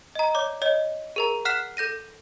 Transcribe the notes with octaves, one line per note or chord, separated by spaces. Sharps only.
D#5 A#5
C#5 D5 D6
C#5 D#5
G#4 A#4 A#5
F#5 F6 F#6 B6 C7 E7
A4 G6 A#6 D#7